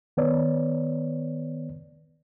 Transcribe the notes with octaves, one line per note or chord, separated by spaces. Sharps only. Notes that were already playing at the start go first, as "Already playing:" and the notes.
D#3 B3 B4 C#5 D5